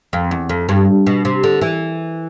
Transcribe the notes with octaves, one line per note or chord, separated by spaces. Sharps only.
F2
E2
F2
G2
B2
C3
D3
E3